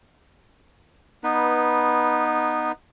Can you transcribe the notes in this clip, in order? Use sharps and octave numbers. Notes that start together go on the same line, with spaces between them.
B3 D#4 B4